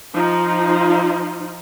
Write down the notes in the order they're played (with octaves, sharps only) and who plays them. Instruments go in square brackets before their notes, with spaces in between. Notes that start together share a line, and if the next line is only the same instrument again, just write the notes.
[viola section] F3 D#4 F4